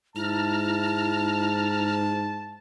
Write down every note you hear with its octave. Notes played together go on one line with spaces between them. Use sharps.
G#2 E4 A5 A#5 F6